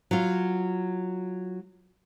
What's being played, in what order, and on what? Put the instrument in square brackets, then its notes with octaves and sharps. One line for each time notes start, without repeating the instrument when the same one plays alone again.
[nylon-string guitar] F#3 F4